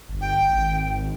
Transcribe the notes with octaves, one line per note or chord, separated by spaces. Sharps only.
G1
G5
G#1